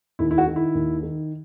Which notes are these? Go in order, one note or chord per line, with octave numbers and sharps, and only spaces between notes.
D#2 E4
E4
F#4
D#3
E4
D#2
D#3